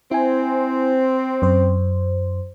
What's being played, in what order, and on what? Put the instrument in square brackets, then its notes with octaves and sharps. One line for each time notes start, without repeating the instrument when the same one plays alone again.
[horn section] C4 [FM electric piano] E4 G#5
[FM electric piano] F#2 C5